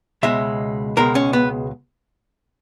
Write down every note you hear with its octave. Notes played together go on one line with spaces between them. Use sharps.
C#2 B2 G#3 E5
C#2 B2 G#3 A#4
C#4
B3